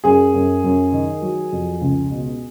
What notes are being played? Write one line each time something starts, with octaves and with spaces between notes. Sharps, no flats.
F#2 G#4
F#2
F#2
D#3
F#3
F2
C#2
B2